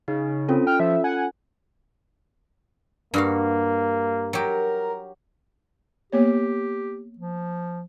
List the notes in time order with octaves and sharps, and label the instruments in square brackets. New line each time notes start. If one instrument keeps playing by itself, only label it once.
[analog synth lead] C#3 [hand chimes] D#4
[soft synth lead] C4 [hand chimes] C#4 F4 A4
[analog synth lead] G5 [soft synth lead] F6
[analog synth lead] F3 [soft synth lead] E5
[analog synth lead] F#5 [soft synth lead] G#5
[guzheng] G2 F#4 F5 [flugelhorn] A#3
[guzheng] F#3 G4 [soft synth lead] A#4
[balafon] A#3 B3 C#5 [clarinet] G4
[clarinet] F3